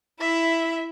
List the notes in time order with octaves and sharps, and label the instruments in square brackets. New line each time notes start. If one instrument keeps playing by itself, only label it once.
[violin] E4 [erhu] E5